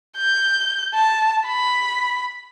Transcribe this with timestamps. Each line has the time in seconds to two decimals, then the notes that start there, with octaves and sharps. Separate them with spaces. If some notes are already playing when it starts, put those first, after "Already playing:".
0.17 G6
0.95 A5
1.47 B5